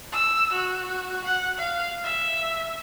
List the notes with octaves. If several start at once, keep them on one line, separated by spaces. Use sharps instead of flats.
E6
F#4
F#5
F5
E5